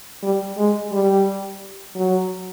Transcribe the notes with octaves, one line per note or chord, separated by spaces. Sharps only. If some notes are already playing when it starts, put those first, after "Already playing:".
G3
G#3
G3
F#3